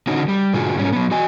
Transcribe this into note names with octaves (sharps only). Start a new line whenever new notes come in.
D3 C#4 D#4 F#4
G3
G#2 B2 D3 F4 F#4 G#4
G#2 G3 C#4
F#3 B3
F#4 D#5 G#5